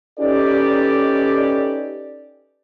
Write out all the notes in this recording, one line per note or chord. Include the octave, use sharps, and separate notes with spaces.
C#4 D#4 G4 A4 B4 D5